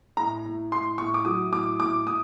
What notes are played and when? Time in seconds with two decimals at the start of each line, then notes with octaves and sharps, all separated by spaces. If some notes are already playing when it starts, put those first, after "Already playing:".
0.17 A2 A#5
0.45 A2
0.72 A2 C6
0.98 A2 C#6
1.14 D6
1.25 F#3 D#6
1.53 A2 D6
1.80 A2 D6
2.06 A2 D#6